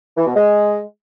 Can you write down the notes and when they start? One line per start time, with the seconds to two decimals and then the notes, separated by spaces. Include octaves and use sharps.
0.17 E3
0.26 B2
0.35 G#3